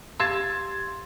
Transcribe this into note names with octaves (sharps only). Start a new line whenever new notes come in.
G4 F5 C6 E6 G#6 A6